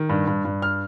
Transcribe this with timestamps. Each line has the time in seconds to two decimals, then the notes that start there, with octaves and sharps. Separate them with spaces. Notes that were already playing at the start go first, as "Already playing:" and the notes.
Already playing: D#3
0.09 G2
0.27 G2
0.45 G2
0.62 F6